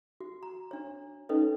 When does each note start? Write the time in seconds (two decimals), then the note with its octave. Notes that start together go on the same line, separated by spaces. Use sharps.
0.21 F#4
0.43 A#5
0.71 D4 C#5
1.29 C#4 D#4 A4 B4 C#5 D#5